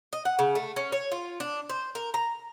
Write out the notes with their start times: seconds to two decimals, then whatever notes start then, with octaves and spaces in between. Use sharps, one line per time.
0.13 D#5
0.25 F#5
0.39 C#3
0.55 A3
0.76 C#4
0.92 C#5
1.12 F4
1.40 D4
1.69 C5
1.95 A#4
2.14 A#5